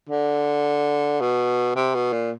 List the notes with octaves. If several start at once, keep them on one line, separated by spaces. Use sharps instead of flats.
D3
B2
C3
B2
A#2